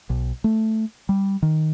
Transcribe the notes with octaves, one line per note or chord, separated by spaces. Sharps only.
B1
A3
G3
D#3